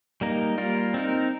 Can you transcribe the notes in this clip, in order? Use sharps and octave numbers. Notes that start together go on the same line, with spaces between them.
G3 A#3 D#4 A#4
G3 A#3 F4 A#4
C4 D#4 A#4